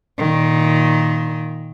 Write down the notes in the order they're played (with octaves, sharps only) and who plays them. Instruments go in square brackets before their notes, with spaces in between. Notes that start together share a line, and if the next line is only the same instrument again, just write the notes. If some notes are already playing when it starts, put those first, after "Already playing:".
[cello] A#2 D#3